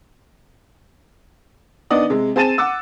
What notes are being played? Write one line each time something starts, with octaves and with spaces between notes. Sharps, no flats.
D#3 B3 D4 D5 D#5 D#6
C3 G#3
C4 G#4 A5 A6 D#7 E7
F#5 D6 E6